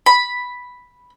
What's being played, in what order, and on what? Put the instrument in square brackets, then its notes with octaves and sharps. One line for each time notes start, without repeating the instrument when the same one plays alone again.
[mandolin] B5